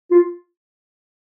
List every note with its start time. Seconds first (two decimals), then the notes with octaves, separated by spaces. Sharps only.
0.11 F4